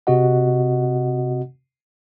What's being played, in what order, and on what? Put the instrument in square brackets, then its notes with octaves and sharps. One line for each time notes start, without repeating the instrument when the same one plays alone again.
[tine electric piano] C3 C4 F#4 D#5 F#5